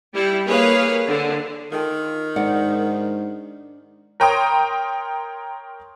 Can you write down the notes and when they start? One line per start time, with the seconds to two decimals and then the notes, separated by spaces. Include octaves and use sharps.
0.13 G3 E4
0.47 A#3 G#4 B4 C#5 F5
1.08 D3
1.72 D#3 F4 A4 G5
2.36 G#2 D4 D#4 D5 F#5
4.20 A#4 C#5 G5 A#5 C6 D#6